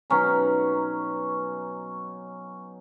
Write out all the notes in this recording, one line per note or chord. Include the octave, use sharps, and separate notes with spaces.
B2 F#3 C#4 D#4